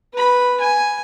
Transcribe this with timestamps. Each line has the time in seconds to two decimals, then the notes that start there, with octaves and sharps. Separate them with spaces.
0.14 B4 B5
0.60 G#5